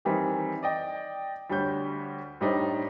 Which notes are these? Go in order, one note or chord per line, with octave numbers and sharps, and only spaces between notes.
D#3 E3 G3 C4 D#4
D5 D#5 G5
D2 G3 C#5 G6
A2 G3 D4 D#4 C5